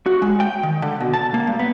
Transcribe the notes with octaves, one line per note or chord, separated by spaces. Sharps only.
F#4
G#3
G5
D#3
D3
B2
A5
A#3
G2
B3